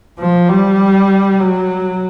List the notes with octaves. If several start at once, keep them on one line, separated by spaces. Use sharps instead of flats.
F3
G3
F#3